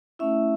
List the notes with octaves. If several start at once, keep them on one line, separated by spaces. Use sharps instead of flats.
A3 C#4 E4 E5